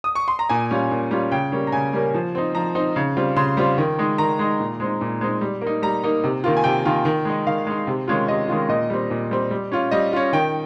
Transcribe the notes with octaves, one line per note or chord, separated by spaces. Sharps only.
D#6
C#6
C6
A#5
A#2 G#5
G3 C#4 F4
A#2
G3 C#4 F4
C#3 G5
G3 A#3 C#4
A#5
C#3 G#5
G3 A#3 C#4
F3
C4 D#4
F3 A#5
C4 D#4
C#3
G3 C4 F4
C#3 C6
G3 C4 F4
D#3
G#3 D#4
D#3 A#5
G#3 D#4
A#2
G#3 C4 D#4
A#2
G#3 C4 D#4
G3
A#3
D#4
G3 A#5
A#3 D#4
C3
D#3 A#3 F4
G#5
C3 G5
D#3 A#3 F4
D#3
G#3 D#4
D#3 F5
G#3 D#4
C3
D#3 G#3 C#4 F4
C3 D#5
D#3 G#3 C#4 F4
A#2 D#5
G3 C4
A#2
G3 C4
G3
C#4 F4
G3 D#5
C#4 F4
D#3 G5